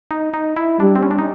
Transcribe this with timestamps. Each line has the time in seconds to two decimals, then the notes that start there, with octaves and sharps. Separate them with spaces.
0.11 D#4
0.34 D#4
0.56 E4
0.80 G3 D4
0.96 C4
1.03 C#4
1.11 D4
1.18 D#4